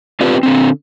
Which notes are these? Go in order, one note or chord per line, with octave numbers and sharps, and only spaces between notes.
C4 D4 F4 G4 B4
D3 C4